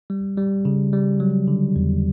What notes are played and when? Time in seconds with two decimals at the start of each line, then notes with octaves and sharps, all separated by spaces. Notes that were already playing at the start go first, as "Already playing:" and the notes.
0.10 G3
0.37 G3
0.65 C#3
0.93 G3
1.20 F#3
1.48 D3
1.76 E2